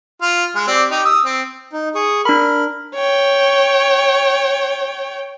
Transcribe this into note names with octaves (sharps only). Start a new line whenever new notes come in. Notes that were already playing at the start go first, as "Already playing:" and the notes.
F4
G#3
C4 G4 D5
D#4 G4
D#6 E6
C4
D#4
G#4 C#6 D#6
D4 A#4 B5
C#5 G5